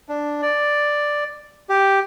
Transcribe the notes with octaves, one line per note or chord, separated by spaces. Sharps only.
D4
D5
G4